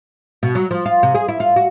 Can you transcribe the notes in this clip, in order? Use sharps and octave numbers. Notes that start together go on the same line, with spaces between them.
B2
F#3
F3
F4
C3
G#4
E4
F4
F#4